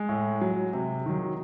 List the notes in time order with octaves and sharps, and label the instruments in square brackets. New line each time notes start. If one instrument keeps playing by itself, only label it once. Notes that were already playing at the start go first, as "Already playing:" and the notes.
Already playing: [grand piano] G#3
A2
F#3
C3
D#3 F#3